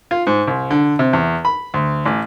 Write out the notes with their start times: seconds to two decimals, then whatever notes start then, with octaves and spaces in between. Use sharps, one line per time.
0.11 F4
0.27 G#2
0.47 C2
0.71 D3
0.99 C3
1.13 E2
1.45 B5
1.74 D2
2.05 A1